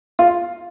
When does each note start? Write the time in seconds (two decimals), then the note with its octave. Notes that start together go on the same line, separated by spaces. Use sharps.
0.19 F4